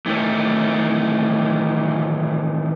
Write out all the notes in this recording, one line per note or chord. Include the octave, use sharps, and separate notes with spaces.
A2 D#3 E3 A3